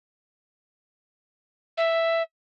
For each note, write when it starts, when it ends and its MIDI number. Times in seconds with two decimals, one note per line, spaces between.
1.78 2.22 76